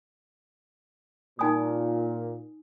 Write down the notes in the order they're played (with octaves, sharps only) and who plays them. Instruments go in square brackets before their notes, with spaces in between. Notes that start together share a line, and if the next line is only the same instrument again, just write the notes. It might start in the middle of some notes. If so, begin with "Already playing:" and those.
[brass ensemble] A#2 [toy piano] D#4 G#5 D#6